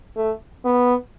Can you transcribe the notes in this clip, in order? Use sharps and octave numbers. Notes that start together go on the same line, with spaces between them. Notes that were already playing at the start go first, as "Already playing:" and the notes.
A3
B3